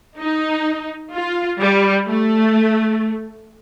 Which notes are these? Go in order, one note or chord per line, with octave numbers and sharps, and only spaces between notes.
D#4
F4
G3
A3